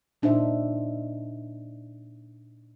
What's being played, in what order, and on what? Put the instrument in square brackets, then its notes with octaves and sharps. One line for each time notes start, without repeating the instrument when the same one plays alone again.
[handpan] A#2 D4 D#4 C5 E5